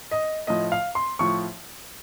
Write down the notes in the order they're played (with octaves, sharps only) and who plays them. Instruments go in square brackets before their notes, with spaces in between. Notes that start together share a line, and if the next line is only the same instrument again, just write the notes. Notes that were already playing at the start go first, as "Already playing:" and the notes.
[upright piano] D#5
A2 F3 D#5
F5
C6
A2 F3 C#6